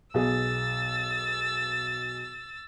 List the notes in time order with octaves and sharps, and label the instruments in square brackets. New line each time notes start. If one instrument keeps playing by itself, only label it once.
[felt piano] B1 B2 G#4 [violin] E6 A6